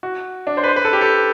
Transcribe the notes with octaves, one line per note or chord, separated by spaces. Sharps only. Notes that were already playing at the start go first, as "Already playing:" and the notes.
F#4
D4
C5
B4
C5
B4
A4
G4
A4